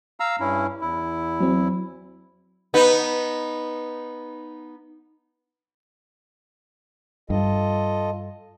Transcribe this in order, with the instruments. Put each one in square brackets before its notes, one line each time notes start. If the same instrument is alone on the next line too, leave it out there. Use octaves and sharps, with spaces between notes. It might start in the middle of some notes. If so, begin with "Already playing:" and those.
[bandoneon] F5 A#5 E6
G2 C#4 E4
E2 E4
[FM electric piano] F#3 C4
[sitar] B3 D#4
[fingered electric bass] G2 [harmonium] F4 A4 D#5